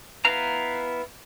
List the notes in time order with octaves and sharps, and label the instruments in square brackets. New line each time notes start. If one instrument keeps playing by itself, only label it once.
[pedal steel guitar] B3 E4 B4 F5 A#5